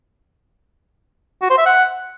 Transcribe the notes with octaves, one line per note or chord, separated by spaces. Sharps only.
F#4
C5
E5
F#5